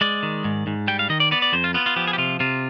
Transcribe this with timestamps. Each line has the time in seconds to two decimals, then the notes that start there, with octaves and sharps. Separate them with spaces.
0.01 G#3 D5
0.23 D#3
0.44 G#2
0.67 G#2
0.88 G3 G5
0.99 F5
1.09 D#3 D#5
1.20 D5
1.31 B3 D5
1.42 D5
1.53 F2 C5
1.64 F4
1.74 B3 F4
1.86 F4
1.96 F3 G4
2.08 G#4
2.13 G4
2.18 C3 F4
2.40 C3 F4